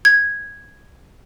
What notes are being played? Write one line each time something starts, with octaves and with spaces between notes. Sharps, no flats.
G#6